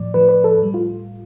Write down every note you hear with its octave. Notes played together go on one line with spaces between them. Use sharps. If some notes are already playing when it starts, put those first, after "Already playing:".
Already playing: A2 F3 D5
A2 F3 B4
B4
A4
A2 G3
F4